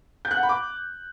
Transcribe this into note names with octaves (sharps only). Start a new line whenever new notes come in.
G6
F#6
F#5
B5
D6